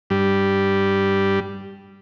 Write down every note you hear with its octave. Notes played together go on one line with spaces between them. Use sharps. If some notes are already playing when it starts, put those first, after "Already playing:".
G2 G3